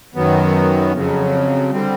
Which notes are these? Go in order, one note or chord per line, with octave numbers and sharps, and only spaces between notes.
F#2 D#3 F#3 B3
F2 C#3 F#3
D3 G3 C4